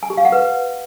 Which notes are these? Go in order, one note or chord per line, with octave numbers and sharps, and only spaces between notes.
G#5
G4
F5
F#5
B4